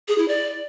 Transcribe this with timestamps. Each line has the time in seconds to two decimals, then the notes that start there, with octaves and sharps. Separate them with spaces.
0.08 G#4
0.18 E4
0.28 D5